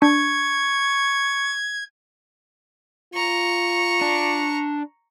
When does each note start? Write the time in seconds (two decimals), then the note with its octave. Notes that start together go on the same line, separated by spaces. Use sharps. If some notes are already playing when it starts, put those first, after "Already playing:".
0.02 D4 C#6 G#6
3.14 F4 A#5 C#6
4.01 D4